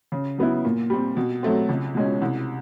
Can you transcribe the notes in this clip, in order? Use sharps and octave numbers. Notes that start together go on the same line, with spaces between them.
C#3
F#3 B3 E4
A#2
G3 C4
B2
F#3 A3 C4
C#2
B2 G#3 C#4
C2